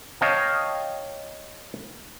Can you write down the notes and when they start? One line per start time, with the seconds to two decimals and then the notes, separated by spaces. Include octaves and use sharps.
0.21 C#5 D#5 F5 G5 A5